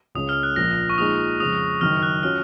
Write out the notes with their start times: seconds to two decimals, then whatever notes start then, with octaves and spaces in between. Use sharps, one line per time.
0.15 C#2 C#3 G#3 C#4 D#6
0.29 F6
0.43 F#6
0.56 A#1 A#2 F3 A#3 A#6
0.90 C#6
0.98 A#2 F3 G#3 D#4 G#4 D#6
1.40 F2 C#3 G#3 D#6
1.81 F#1 F#2 D#3 F6
2.03 F#6
2.23 F#3 C#4 F4 F6